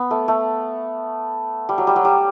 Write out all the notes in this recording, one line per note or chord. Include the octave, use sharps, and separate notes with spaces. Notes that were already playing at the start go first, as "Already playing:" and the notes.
Already playing: B3
A3
A3
G3
F#3
G3
F#3
G3